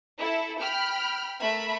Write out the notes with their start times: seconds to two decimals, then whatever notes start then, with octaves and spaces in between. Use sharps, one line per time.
0.19 E4 A4
0.60 G5 B5 F6
1.40 A3 A#4 E5 B5